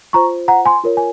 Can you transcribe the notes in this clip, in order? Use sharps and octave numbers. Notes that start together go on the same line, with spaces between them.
F4 C5 A#5 C#6
F#5 A#5
G#5 C6
F4 A#4 C#5
G#5